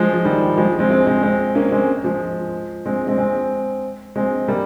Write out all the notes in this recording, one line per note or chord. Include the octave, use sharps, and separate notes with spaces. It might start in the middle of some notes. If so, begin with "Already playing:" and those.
Already playing: F3 G#3
F3
D#3 G3
F3 G#3
G#3 C4
G#3 C4
G#3 C4
G#3 C4
A#3 C#4
G#3 C4
F3 G#3
G#3 C4
G#3 C4
G#3 C4
G#3 C4
G3 A#3